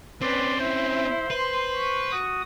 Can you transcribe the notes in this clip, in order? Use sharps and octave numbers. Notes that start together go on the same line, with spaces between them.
C4 C#4 B4 D5 C6
E4 C5
B4 C6
C#6
F#4 D#6